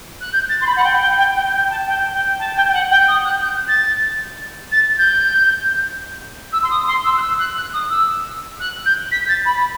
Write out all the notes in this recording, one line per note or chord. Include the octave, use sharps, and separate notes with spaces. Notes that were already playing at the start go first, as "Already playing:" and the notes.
F#6
G6
A6
C6
B5
F#5
G5
G5
G5
G5
G5
A5
G5
G5
A5
G5
G5
F#5
G5
D#6
F#6
G6
A6
A6
A6
G6
E6
C6
D#6
C6
E6
F#6
E6
F#6
F#6
D#6
E6
F#6
G6
B6
A6
B5